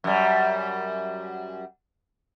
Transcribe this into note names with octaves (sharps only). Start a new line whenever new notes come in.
F#2 G3